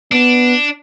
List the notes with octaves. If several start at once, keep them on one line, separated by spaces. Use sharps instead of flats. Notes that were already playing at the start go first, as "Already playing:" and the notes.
B3 D4